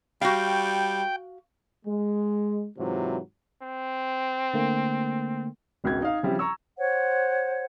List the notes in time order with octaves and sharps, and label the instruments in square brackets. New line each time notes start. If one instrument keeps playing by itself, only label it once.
[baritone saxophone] G3 [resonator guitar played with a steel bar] F#4 F5 [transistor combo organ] G5
[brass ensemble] G#3
G#2 C3 E3 F#3 F4
[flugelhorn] C4
[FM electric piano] D3 A3 A#3
[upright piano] G#1 C#2 B2 G#6
D#4 F5
C#3 F3 G3 C4 E4 G4
A#5 C#6 E6
[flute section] C5 C#5 F#5